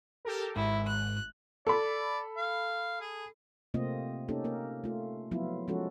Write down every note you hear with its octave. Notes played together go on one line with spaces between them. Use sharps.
G4 A4 A#4
G#1 G#2 E4
F#6
A4 D5 B5
F5
G#4
C3 A3 A#3 C4 F4 D#5
A#3 C#4 D#4 G4 A4
A#3 A#4
A3 F4
F3 F#3 B3 E4 F4
F3 G#3 C#4 F#4 A4